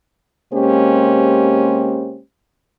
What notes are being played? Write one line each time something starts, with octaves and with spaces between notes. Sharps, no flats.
C3 G#3 A#3 C#4 G4 C5